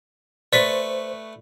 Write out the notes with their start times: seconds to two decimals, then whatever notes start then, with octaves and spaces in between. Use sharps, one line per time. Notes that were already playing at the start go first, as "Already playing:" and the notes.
0.53 A3 B4 C5 D5 C#6 B6